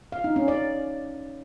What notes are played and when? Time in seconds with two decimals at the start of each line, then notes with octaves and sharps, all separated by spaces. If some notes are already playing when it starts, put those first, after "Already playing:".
0.12 F5
0.24 D#4
0.36 C#4
0.48 D5